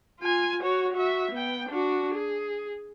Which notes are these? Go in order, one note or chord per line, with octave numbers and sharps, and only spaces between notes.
F4 G#5
F#4 C#5
F#4 E5
B3 G5
D4 F#4
G#4